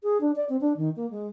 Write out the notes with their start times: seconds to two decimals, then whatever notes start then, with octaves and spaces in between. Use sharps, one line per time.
0.03 G#4
0.21 D4
0.36 D5
0.49 C4
0.61 D4
0.77 D#3
0.96 A#3
1.10 G#3